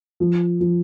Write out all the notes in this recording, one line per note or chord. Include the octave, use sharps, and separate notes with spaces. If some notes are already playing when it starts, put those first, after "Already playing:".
F3
F3